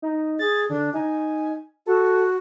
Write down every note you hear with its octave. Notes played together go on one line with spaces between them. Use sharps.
D#4
G#4 A6
D3 D4
D#4 G#5
F#4 A4